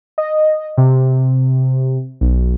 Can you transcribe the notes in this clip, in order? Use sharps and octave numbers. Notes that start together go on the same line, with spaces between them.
D#5
C3
B1